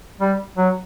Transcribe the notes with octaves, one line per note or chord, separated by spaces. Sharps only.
G3
F#3